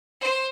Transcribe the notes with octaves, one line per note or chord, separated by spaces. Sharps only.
C5